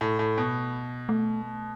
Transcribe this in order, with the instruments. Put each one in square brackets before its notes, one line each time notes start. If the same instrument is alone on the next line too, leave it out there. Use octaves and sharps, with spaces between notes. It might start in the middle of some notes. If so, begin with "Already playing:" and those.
[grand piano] A2
A2
B2
[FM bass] A3